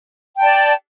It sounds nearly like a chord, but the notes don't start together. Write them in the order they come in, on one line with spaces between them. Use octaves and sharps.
G5 A5 D5